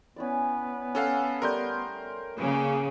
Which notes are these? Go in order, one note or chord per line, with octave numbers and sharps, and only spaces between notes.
B3 C#4 E4 D5
C#4 A4 F5 F#5 G#5
G3 A3 G4 A#4 C6 G6
C#3 A#3 G#4 B4